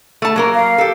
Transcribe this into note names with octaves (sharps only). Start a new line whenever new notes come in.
A3 A5
F#3 A#3 A#4
F5
G4 A4